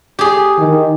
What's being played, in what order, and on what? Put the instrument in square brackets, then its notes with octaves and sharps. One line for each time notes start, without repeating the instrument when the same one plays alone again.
[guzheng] G4 G#4
[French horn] D#3